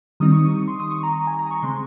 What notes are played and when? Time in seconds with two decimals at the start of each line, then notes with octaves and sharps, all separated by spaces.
0.20 D#3 G3 C4 D#4 D#6
0.33 C#6
0.44 D#6
0.56 C#6
0.68 C6
0.80 D#6
0.91 C#6
1.03 A#5
1.15 A#5
1.27 G#5
1.39 A#5
1.51 C#6
1.62 C#3 G#3 C4 C6